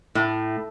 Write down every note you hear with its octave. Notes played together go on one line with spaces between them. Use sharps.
A2